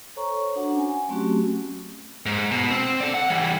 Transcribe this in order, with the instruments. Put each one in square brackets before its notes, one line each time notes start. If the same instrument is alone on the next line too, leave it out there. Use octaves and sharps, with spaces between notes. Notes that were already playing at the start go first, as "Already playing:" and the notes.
[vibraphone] A4 C5 C#5 A#5 C#6
D4 F#4 F#5
C#4 G#5
F#3 A3 C4 C#4 F#4 G4
[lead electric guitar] G#2
B2
C4
A4 D5
F#5
E3 G3